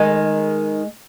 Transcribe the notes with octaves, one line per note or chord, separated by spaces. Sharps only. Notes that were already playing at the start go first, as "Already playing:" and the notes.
Already playing: D#3 G#3